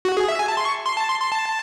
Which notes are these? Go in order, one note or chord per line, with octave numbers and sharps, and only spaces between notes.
F#4
G#4
E5
G#5
A5
C6
C#6
C6
A5
C6
C6
A5